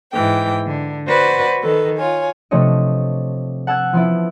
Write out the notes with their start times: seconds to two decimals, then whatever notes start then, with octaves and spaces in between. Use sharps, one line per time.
0.13 G#2 E3 G5
0.65 D3
1.07 F#4 B4 C5 D5 F#5
1.63 D#3 A4 B4
1.97 F4 C#5 G#5
2.51 C3 F3 A3 D4 C#5 D#5
3.67 F#5 A5 E6 F#6 G#6
3.93 F3 B3 E4